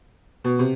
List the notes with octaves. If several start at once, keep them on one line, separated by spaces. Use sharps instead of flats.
B2
C3